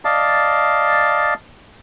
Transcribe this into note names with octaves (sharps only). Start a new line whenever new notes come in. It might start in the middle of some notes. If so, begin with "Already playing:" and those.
D5 D#5 F5 A5